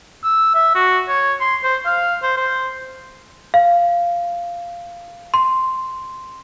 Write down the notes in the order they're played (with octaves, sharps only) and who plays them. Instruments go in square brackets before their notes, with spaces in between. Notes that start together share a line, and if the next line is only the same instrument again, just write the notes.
[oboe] E6
E5
F#4
C#5
C6
C5
F5
C5
C5
[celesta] F5
C6